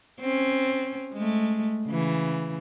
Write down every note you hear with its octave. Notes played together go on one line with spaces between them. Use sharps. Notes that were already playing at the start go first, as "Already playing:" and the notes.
C4 C#4
G#3 A3
C#3 E3